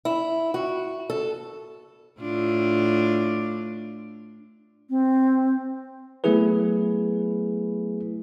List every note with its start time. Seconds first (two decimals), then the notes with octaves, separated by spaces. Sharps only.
0.05 E4
0.54 F#4
1.10 A4
2.20 A2 D4 F4
4.90 C4
6.24 F#3 A3 B3 E4 G#4 B4